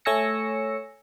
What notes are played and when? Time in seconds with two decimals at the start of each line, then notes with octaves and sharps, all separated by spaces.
0.05 A3 C#5 G#5 E6 A#6 C#7